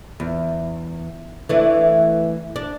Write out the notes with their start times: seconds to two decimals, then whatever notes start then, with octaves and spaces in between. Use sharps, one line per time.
0.20 E2
1.49 E3 A3 D4
2.56 D4